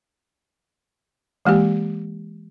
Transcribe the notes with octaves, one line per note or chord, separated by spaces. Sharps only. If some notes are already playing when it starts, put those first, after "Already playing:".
E3 G#3 A#3 G4